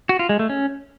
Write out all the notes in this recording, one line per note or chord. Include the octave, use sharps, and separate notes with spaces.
F#4
F4
G#3
A3
C#4